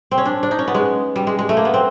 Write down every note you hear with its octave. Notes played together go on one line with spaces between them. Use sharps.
C4
C#4
D4
D4
D#4
C#4
B3
G#3
G3
G#3
G#3
A3
A#3
B3
C4